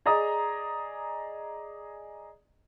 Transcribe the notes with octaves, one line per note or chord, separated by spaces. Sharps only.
G#4 D5 D#5 A#5 D#6